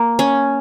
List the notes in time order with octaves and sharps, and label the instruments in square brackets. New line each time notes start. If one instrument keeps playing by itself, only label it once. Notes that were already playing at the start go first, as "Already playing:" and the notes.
Already playing: [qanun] A#3
C#4